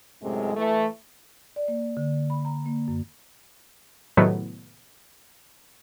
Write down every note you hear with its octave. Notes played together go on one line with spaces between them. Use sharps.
F#2 A2 C3 G#3
E3 A3
D5
A#3
D3
B5
A#5
A#3
F#2
A2 C3 D#3 F#3 A3 B3